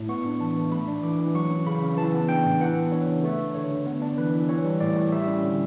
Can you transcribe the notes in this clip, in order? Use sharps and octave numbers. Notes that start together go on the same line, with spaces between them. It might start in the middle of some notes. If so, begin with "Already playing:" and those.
Already playing: A2
B3 C#6
D4
E3 A5
E3
A3 B5
D4
E3 D6
E3
F#3 C#6
C#4
C#3 B5
C#3
E3 A5
B3
D4 G5
A2
E3 F#5
B3
D4 C#5
C#3
A3 B4
D4
D3 C#5
D3
B3
D4
E3 B4
E3
E3 C#5
G3
A2 D5
A2
G3 E5
C#4
D3